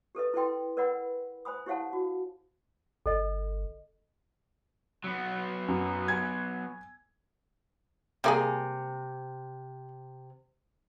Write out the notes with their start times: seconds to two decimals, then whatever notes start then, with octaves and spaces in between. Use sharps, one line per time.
0.15 G4 A4 B4 D#5
0.34 E4 A4 B4 D#5 G5 C6
0.77 A#4 B4 D5 D#5 F#5 B5
1.45 C5 G#5 B5 D#6
1.66 E4 G4 C#5 F5 F#5 A5
1.93 F#4
3.06 G1 A4 D#5
5.04 F#3 B3
5.68 F#2
6.08 G#5 G#6
8.24 C3 G3 A#3 G#4